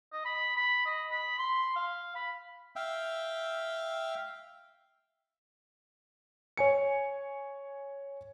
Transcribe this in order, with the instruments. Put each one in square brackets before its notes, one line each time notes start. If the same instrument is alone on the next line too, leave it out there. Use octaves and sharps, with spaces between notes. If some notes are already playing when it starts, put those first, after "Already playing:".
[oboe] D#5
B5
B5
D#5
B5
C6
F5
B5
[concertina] E5 F5 G5
[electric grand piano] C#5 G#5 C#7